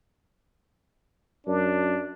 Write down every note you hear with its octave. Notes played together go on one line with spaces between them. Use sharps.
F#2 D4